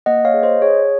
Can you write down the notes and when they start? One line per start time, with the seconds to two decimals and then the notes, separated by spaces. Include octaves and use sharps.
0.06 A#3 D#5 F#5
0.25 C#5 F5
0.34 G#4
0.43 C5 D#5
0.62 G#4 C#5